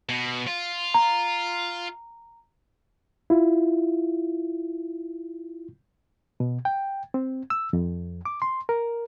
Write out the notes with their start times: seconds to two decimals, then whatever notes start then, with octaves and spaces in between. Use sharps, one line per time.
0.09 B2
0.47 F4
0.94 A#5
3.30 E4 F4
6.40 B2
6.65 G5
7.14 C4
7.50 E6
7.73 F2
8.25 D6
8.42 C6
8.69 A#4